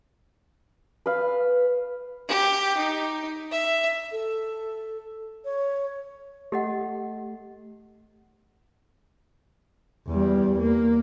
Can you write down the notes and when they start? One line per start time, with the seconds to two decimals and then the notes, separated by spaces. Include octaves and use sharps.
1.06 B4 F5
2.28 G4
2.77 D#4
3.51 E5
4.12 A4
5.45 C#5
6.52 A3 G4 D#5 F#5
10.08 E2 G3
10.59 A#3